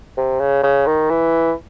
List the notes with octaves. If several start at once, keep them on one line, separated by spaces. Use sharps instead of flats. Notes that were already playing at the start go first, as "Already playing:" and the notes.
C3
C#3
C#3
D#3
E3